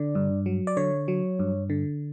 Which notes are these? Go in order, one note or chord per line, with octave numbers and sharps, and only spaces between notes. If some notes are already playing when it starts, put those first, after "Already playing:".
Already playing: D3 D5
G2
F#3
D5
D3 C#5
F#3
G2
D3